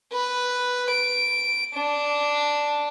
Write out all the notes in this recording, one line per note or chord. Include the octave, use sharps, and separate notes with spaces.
B4
D7
D4